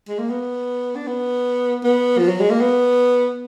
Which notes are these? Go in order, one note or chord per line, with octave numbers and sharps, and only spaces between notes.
G#3
A#3
B3
D4
B3
B3
F3
F#3
G#3
A#3
B3